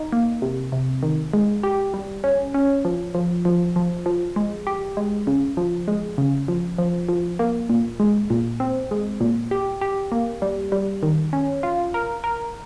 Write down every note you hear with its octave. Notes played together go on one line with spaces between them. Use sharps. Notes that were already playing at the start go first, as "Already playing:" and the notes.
Already playing: D#4
A#3
C3
C3
D#3
G#3
G4
G3
C#4
C#4
F3
F3
F3
F3
F3
G#3
G4
G#3
C#3
F3
G#3
C#3
F3
F3
F3
A#3
A#2
G#3
A#2
C4
G#3
A#2
G4
G4
A#3
G3
G3
D#3
C#4
F4
A#4
A#4